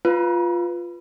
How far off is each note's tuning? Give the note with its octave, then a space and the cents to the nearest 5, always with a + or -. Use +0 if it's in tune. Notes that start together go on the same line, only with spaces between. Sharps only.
F4 +0 B4 +0